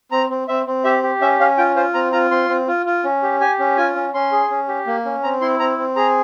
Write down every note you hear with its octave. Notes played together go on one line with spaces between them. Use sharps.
C4 A#5
C4
C4 E5
C4
G4 E5
G4
C#4 E5
C#4 F5
F4 G5
F4 C5
C4 A#5
F4 A#5
C4 C6
C4
F4
F4
C#4
G4
G4 G#5
C#4
F4 G#5
C#4
C#4 C6
G#4
C#4
G4
A#3
C#4
C4 A#5
E4 C6
C4 A#5
C4
G#4 A#5